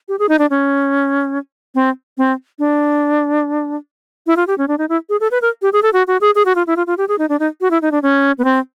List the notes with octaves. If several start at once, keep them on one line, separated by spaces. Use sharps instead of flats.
G4
G#4
D#4
D4
C#4
C4
C4
D4
E4
F4
G4
C#4
D4
D#4
E4
G#4
A4
B4
A#4
G4
G#4
A4
F#4
F#4
G#4
G#4
F#4
F4
E4
F4
F4
G4
G#4
D#4
D4
D#4
F#4
E4
D#4
D4
C#4
B3
C4